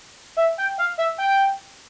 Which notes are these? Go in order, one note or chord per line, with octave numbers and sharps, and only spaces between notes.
E5
G5
F5
E5
G5